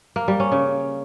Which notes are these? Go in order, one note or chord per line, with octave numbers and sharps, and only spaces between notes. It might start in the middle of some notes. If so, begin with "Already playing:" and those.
A#3
G3
C#4
C#3